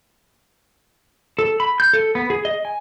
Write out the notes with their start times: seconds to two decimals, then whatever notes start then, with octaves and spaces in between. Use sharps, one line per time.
1.39 A4
1.60 B5
1.80 G6
1.93 A4
2.15 B3
2.30 G#4
2.45 D#5
2.65 G#5